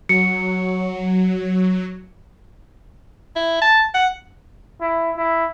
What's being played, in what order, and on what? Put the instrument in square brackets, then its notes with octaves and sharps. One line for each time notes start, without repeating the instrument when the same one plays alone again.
[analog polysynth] F#3 [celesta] C#7
[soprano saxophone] E4
A5
F#5
[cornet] E4
E4